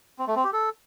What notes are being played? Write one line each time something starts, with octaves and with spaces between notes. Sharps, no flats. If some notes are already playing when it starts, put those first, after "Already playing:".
C4
A3
C4
G4
A4